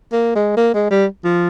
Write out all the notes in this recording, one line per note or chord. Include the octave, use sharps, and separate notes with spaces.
A#3
G#3
A#3
G#3
G3
F3